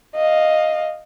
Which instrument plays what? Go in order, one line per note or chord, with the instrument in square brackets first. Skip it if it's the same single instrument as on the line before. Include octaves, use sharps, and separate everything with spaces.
[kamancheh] D#5 F5